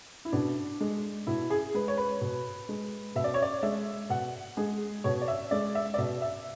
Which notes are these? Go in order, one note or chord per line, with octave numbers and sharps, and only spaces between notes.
E4
B2 D4
G#3
B2 E4
G#4
G#3 B4
C#5
B4
B2
G#3
B2 E5
D5
C#5
D5
G#3 E5
B2 F#5
G#3 G#4
B2 C#5
D5
E5
G#3 D5
E5
D5
B2 E5
E5